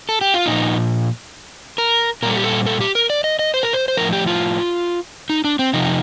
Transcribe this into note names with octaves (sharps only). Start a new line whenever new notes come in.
A4
G4
F4
A#2 F3 D#4
A#4
A#2 G3 A4 A#4
G4
A4
A4
G4
A#4
D5
D#5
D#5
C5
A#4
C5
C5
A2 F3 A#4
G4
F4
D#4
D4
C4
F2 C3 F3 D#4